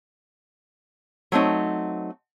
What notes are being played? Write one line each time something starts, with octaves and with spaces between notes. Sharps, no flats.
F#3 A3 C4 D#4